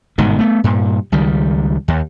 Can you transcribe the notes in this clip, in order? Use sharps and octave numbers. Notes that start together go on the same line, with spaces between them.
G1 G#2 B2 D#3
A3 B3
G2 A#2
C#2 D#3 G3
D#2